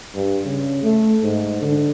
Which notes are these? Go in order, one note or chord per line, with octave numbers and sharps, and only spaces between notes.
G2
C#3
A3
G#2
D3